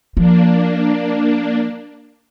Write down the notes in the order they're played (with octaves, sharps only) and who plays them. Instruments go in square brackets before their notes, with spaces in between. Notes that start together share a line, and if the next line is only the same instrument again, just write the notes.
[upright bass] F3 [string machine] A#3 D4